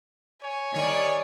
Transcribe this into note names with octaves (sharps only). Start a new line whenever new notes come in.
C#5 G#5
D#3 G3 C#5 D5